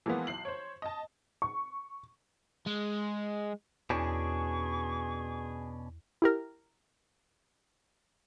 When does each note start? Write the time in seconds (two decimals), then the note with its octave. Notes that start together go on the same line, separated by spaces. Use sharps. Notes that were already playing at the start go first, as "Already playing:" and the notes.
0.06 E3 F3 G#3 A#3 B3
0.27 B1 C7 F#7
0.45 C5 C#5
0.82 D#5 A5
1.42 C#6
2.66 G#3
3.90 E2 B2 C#4 D4 G#4 C#6
6.22 E4 G4 A#4